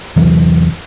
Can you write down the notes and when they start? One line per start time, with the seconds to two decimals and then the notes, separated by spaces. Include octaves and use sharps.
0.16 E2 C3 E3 F#3